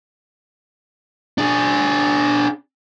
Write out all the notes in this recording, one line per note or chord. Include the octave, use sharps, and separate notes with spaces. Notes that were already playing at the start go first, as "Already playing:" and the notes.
D4 G#4